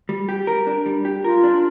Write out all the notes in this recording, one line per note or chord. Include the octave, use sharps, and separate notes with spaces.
G3
G4
A#4
D4
G3
G4
F4 A#4
D4